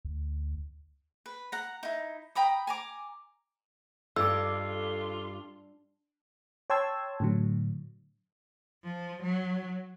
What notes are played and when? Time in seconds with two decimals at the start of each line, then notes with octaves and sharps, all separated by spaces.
0.05 D2
1.26 B4
1.52 F#5 A#5
1.83 D#4 E4
2.35 G5 A#5 B5 D#6
2.67 G#5 A#5 D6
4.16 G2 F4 A4 D6 E6
6.70 C#5 G5 A5 C6 E6 G#6
7.20 A2 D3 F#3
8.84 F3
9.23 F#3